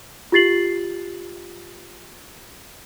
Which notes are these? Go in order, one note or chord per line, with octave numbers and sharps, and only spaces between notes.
F4 G4 A6 C7 F#7